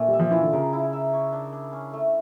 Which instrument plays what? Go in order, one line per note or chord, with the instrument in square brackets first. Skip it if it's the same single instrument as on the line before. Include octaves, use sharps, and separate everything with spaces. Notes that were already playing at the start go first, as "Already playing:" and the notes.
Already playing: [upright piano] A#2 [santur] A3 D4
[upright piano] G3
[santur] E5
[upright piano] F3
[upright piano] E3 [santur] F4
[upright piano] D3
[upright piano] C#3 [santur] A#4
[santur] E4
E5
C#5
D4
D4
C#4
A3